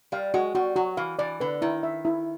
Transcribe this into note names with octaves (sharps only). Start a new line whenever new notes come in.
G3 F5
G#3 F#4
G3 F#4
F#3 F#4
E3 F5
E3 D5
D3 B4
D#3 E4
E5
E4